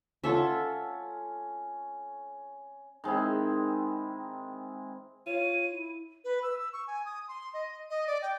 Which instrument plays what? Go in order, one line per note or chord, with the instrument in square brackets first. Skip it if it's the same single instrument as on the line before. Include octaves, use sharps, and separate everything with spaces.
[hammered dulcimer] C#4 F#5 [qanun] F4 A4 E5
[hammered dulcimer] D#3 G#3 C4 E4
[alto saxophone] F4 [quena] C#5 [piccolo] D#7
[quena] E4
[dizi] B4
E6
E6
C#6
G#5
D#6
C6
D#5
D#5
D5
G5